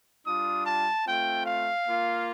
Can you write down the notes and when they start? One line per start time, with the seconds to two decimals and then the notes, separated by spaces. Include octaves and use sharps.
0.24 G3 D4 F4 D#6
0.65 A5
1.05 A3 C4 F4 G5
1.46 F5
1.86 A#3 F4